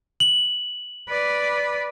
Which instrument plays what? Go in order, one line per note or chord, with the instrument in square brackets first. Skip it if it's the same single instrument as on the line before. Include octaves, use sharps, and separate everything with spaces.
[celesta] F#7
[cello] B4 D5